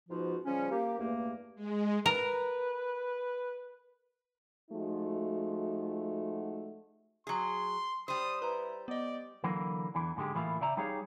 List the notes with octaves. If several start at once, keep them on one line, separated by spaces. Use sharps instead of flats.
G#2 B2 F3 D#4 F4 F#4
C#3 F3 G3 C#4
A#3 G4
E2 G2 A3 A#3
G#3
A#4 B4
F3 G#3 A3 D#4 F#4
F#3 G#4 C6
G3 C5 D#6
E4 B4 A#5
B3 D5 D#5
D3 E3 F#3 A#3
E2 D3 E3
G#2 D3 G#3 G4
A2 E3 A#3 E4 F4 F5
C#3 D5 E5 A#5
G3 D#4 G4 G#4 C#5 F5